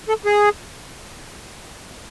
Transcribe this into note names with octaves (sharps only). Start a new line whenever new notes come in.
A4
G#4